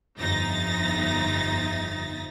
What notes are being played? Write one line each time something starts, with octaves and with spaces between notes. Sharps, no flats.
G1 F2 D#4 E5 A6 A#6